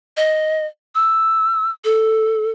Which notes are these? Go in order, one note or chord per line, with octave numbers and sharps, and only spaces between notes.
D#5
E6
A4